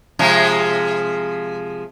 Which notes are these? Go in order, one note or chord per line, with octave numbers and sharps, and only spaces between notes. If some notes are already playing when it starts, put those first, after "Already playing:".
C3 F3 G#3